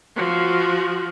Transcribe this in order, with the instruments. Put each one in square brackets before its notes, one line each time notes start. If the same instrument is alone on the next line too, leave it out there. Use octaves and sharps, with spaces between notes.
[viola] F3 F#4